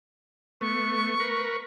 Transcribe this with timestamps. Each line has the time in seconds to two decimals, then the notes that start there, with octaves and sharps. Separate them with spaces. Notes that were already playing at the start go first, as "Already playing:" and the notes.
0.61 A3 B3 C#6
1.20 A#4 B4